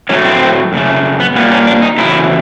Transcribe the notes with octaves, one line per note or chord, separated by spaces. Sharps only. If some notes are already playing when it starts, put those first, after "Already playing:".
A2 F#3 A3 C#4
C4
F#2 C#3 A3
B3
A#2 G3 A#3 B3
C#4
D4
D#4
E2 C#3 F#3 A3 E4